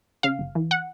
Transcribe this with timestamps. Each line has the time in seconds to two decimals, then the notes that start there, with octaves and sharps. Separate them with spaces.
0.23 C#3 F5
0.39 G1
0.55 E3
0.71 F#5